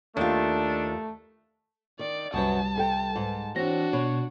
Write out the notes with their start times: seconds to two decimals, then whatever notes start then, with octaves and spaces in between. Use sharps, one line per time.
0.17 D#2 A3 D4 F4
1.99 D#3 D5
2.34 C2 F#2 F#3 G3 B4 A5
2.76 C3 A4 G5
3.16 G#2
3.56 E3 C4 D4 F#4 C#5 A#6
3.93 B2 C#5